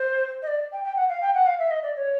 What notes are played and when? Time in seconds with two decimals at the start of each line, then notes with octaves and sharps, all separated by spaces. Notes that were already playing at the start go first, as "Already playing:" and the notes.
Already playing: C5
0.42 D#5
0.47 D5
0.72 G5
0.84 G5
0.96 F#5
1.09 F5
1.21 G5
1.34 F#5
1.46 F5
1.59 E5
1.71 D#5
1.83 D5
1.96 C#5